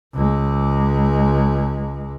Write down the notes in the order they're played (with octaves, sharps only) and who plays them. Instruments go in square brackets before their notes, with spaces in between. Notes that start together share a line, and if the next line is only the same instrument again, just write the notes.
[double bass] C#2 G#3